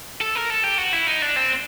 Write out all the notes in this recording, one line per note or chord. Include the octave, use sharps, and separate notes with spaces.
A4
A#4
A4
G4
F#4
E4
D#4
D4
C4